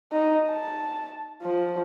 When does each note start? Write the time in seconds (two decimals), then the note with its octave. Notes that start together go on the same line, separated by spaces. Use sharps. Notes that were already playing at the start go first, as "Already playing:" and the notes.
0.12 D#4
0.50 A5
1.42 F3